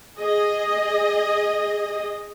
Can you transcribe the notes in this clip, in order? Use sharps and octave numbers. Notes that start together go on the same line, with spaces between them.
G#4 D#5